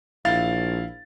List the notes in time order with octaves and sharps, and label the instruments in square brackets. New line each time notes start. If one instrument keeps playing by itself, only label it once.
[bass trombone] A#1 [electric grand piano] E4 F5 A6